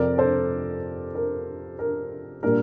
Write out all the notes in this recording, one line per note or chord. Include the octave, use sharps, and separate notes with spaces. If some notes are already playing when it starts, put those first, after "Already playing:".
Already playing: F2 C3 F3 C4 A#4 D5
A4 C5
A#4
A#4
A#2 G3 A#3 D4 A#4